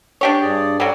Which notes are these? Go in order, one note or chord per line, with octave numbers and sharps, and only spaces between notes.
D4 G4 C#5
G2 G#4 D5
F#3 G3 C#4 A4